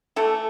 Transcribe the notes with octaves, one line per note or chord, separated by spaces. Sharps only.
E3 A3 E4 A4